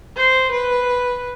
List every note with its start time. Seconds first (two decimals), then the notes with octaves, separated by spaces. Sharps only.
0.17 C5
0.51 B4